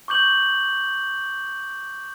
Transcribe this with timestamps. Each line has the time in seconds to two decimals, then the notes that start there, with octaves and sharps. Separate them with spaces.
0.08 C#6 D6 G6 F#7